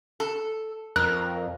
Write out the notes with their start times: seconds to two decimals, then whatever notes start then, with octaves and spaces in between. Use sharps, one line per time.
0.20 A4
0.96 F2 A#4 F#6